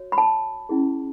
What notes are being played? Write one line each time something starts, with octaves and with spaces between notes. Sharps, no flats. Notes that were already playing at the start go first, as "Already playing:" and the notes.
Already playing: F#4 C#5
B5
A5
C#4 E4 G#4